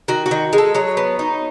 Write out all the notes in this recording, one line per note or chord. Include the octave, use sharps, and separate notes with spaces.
D#3 F#4
F#4
D#3
G#3
A4
F#3 C#5
B3
D#4